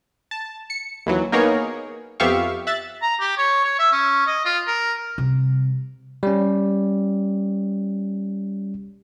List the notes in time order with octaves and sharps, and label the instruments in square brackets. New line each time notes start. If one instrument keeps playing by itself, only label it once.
[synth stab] A5
C#7
D#2 E3 F#3
A#3 B3 D#4 G#4 A#4 C#5
F2 B3 G4 E5 F5 C#6
E5 F#6 A6
[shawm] A#5
G4
C#5
C#5
E5
C#4
D#5
F4
A#4
[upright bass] C3 G3
[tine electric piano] G3 C#4